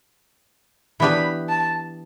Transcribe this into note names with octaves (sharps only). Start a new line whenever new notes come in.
E3 B3 D4 G4 B4 B5
A5